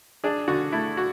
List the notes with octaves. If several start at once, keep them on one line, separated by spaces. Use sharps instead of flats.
D4 G#4
D3 F#4
A3 E4
F#4